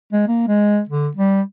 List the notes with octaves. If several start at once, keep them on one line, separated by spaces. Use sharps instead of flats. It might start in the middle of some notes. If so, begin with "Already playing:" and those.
G#3
A#3
G#3
D3
G3